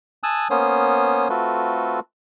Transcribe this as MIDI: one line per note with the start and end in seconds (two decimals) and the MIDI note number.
0.23 0.48 80
0.23 0.48 81
0.23 0.48 87
0.23 0.48 88
0.23 0.48 90
0.50 1.28 58
0.50 1.28 59
0.50 1.28 61
0.50 1.28 72
0.50 1.28 73
0.50 1.28 87
1.30 2.00 57
1.30 2.00 60
1.30 2.00 65
1.30 2.00 66
1.30 2.00 69
1.30 2.00 71